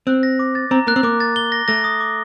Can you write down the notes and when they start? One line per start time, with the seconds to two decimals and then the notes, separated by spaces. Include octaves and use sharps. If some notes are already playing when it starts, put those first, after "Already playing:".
0.07 C4 F#6
0.23 A#6
0.39 D6
0.55 A6
0.71 C4 A#5
0.87 A#3 F#6
0.96 C4
1.03 A#3 D6
1.20 A6
1.36 G7
1.52 A#6
1.68 A3 A#6
1.84 D#6
2.00 D6